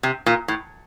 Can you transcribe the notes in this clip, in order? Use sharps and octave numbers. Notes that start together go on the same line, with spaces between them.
C3
A#2
A2